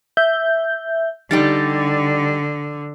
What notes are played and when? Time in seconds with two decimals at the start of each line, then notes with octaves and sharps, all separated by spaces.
0.17 E5 G6
1.31 D3 G3 D#4 G4 A6